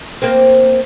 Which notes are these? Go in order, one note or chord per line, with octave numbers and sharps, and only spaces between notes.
A#3 C4